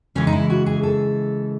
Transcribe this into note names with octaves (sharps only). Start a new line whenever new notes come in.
C#3 E3 G#3 C#4
D#4
E4
F#4
G#4
A4